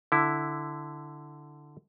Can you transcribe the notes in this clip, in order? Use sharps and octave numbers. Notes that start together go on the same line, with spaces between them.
D3 E4